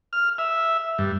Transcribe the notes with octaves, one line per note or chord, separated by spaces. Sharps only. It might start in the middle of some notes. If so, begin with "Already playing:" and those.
F6
E5
G2